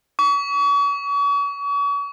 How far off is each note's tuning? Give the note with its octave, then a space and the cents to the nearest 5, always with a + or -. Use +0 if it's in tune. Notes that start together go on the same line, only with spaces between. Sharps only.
C#6 +40